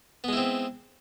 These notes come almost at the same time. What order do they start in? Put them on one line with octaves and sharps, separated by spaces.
B3 G#3 E4 C4